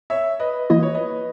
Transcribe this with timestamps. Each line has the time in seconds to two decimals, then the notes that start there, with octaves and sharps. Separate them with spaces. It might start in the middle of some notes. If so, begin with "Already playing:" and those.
0.10 C#5 E5
0.40 B4 D#5
0.70 E3 A#3 E4 D#5
0.83 C#5
0.95 B4 D#5